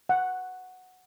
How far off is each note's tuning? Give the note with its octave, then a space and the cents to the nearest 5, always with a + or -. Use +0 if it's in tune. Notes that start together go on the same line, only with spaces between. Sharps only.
F#5 -5